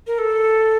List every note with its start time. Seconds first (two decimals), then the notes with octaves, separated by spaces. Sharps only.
0.07 A#4
0.19 A4